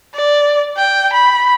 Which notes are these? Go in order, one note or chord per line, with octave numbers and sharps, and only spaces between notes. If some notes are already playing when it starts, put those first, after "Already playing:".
D5
G5
B5